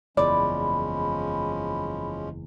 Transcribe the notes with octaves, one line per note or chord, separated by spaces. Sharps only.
F#1 E2 F3 G#3 C#4 D5 B5